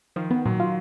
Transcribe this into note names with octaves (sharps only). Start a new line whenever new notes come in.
D#3 F3
B3
A#2 F#3
F4